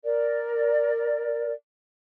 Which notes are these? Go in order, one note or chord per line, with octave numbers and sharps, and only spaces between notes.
A#4 D5